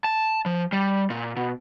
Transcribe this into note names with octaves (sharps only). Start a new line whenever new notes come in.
A5
F3
G3
A#2
B2